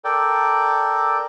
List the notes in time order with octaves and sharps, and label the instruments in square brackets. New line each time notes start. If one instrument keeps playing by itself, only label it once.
[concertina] A4 A#4 D5 G5